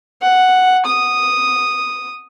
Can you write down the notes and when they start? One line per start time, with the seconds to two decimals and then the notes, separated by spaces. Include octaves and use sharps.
0.22 F#5
0.85 D#6